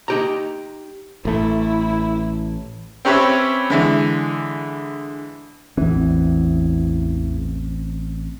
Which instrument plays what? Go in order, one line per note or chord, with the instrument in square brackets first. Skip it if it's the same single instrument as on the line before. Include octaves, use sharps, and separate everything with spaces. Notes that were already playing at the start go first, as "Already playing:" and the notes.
[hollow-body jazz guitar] D#4 G4 A#5
[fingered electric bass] A1 A3 [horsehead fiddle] E4
[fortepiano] C4 C#4 G4 B4 C#5 E5
D3 E3 G#3
[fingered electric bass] A1 C4 [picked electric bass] E2 E3